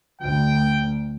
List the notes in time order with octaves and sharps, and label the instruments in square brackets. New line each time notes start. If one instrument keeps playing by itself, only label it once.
[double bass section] D2 [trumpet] G5